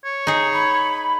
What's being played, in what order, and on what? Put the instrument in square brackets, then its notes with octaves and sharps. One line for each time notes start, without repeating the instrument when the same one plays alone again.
[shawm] C#5
[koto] D#4 G#4
[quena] B5